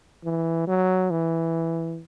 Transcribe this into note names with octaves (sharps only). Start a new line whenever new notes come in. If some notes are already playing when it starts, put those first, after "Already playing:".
E3
F#3
E3